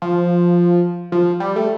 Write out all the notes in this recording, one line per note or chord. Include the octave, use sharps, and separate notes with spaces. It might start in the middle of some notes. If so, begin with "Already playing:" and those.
F3
F3
G3
A3